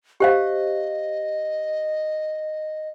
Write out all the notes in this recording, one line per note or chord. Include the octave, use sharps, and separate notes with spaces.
G4 C5 D#5 F5